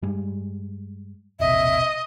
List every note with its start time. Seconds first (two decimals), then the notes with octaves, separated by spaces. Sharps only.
0.02 G2 G3 G#3
1.40 E1 A#1 C3 D#5 E5